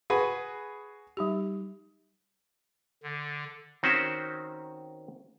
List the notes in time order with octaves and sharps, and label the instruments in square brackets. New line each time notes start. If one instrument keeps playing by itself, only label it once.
[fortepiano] F#4 G#4 B4
[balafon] G3 D#4 G4
[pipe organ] D3
[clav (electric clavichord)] D#3 C4 C#4 F#4 C5